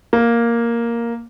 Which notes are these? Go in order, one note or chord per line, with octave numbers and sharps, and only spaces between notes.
A#3